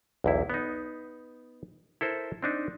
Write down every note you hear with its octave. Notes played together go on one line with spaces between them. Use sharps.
B1 E2 E4
B3 D#4
E4 A4 A#4 C5
C4 D4 D#4